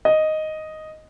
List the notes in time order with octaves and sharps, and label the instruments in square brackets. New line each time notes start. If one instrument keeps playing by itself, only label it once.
[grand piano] D#5